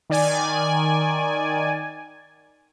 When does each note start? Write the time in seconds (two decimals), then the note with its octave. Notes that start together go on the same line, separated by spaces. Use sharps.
0.10 D#3 D5 G#5